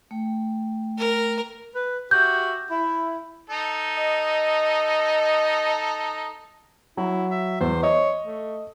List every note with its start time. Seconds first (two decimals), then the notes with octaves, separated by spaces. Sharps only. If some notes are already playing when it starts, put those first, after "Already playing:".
0.11 A3 G5
0.98 A#4
1.75 B4
2.11 F#4 G4 E5 G6
2.70 E4
3.49 D#4 A4
3.97 D#5
6.97 F#3 E4
7.31 E5
7.61 E2 C5
7.83 C#5 D#5
8.23 A3